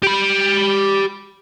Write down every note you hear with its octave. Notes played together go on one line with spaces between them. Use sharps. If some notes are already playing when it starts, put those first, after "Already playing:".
G4 B5